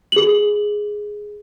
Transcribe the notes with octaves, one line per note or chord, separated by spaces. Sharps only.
G#4 F#7